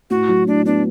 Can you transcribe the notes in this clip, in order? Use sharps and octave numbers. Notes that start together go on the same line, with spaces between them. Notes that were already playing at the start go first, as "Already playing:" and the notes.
A2 F#4
F#3
A2 D4
B3 D4